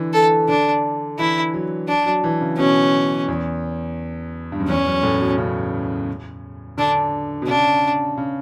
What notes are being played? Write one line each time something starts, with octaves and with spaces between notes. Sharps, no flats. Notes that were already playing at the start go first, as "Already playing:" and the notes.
Already playing: D3 E3
A4
D3 D4
E3 E4
F#3
D4
F#3
E3
C#3
B2 C#4
E2
G2
F#2
E2 C#4
F#2
A2
B2
C#3
D3 D4
B2
C#3 D4
C#3